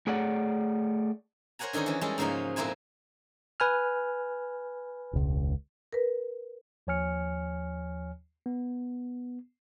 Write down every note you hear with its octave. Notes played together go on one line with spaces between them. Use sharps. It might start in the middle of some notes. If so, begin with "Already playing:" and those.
A3 G#4 C#5 D5 F#5
A#4 C5 C#5 F#5 G#5 A#5
D3 D#3 C#4 G#4 A#4
E3 C#4
G3 G#3 C#4 A4
G#2 C#3 F3 A#3 D#4
F2 A#2 A#3 E4 C5 G#5
B4 G#5 F6
E1 C#2
A#4 B4
D#2 F3 C#5 G#5 F6 C#7
B3